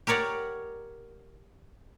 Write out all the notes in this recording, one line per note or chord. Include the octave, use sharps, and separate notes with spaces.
G4 A#4 C#5 D5 F#5